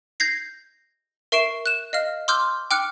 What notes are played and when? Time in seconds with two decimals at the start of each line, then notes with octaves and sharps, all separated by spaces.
0.20 G6 G#6 A#6 C7
1.32 A#4 E5 C#6 C7 D7 E7
1.66 F#6 E7
1.93 D#5 F5 F6
2.28 C6 D6 E6 F6 G6
2.71 G5 D6 F6 F#6 C#7